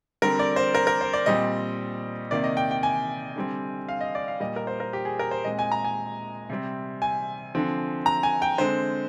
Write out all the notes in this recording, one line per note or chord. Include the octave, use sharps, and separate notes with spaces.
D3 G3 C4 A#4
D5
C5
A#4
A#4
C5
D5
A#2 G3 C4 D#5
C3 D#3 A#3 D5
D#5
G5
G5
G#5
D3 G3 C4
F5
D#5
D5
F5
A#2 G3 A#3 D#5
A#4
C5
A#4
G4
G#4
A#4
C5
A#2 G#3 C4 D#5
G#5
A#5
G#5
C3 G3 C4
G#5
D3 F3 C4
A#5
G#5
G5
D3 G#3 C4 C5